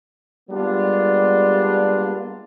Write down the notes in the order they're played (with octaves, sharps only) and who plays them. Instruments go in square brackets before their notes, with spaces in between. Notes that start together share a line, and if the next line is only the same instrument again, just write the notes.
[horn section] G3 G#3 A#3 B3 D4 F4